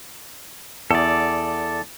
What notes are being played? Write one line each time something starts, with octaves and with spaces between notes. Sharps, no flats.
E2 A4 D5